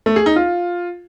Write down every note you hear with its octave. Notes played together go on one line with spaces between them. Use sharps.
A3
G#4
D#4
F4